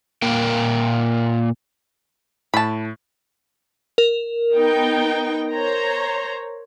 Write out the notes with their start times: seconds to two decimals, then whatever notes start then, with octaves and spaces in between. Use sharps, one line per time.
0.22 A#2 A#3 A#4 G5
2.54 A2 A5 B5
3.98 A#4
4.53 B3 D#4 G5
5.52 C5 C#5 A#5